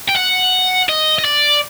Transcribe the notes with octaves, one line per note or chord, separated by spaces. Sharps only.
G5
F#5
D#5
D#5
D5